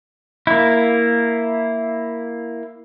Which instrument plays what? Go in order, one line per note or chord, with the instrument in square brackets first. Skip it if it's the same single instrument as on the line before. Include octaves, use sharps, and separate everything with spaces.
[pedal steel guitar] A#3 E4